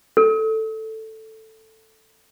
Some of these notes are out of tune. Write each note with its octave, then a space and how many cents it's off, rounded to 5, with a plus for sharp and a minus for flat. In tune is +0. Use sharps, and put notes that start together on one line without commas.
A4 +5